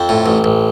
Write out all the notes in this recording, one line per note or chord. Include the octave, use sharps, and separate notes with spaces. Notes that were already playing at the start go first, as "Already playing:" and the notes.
Already playing: F2 C4
A2
A1
A1